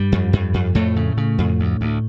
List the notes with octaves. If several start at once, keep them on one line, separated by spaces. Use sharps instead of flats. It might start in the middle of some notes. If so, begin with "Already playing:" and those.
Already playing: G2 G3
F2
F2
F2
F2 A2 A3
C#3
C#3
F2
D2
D2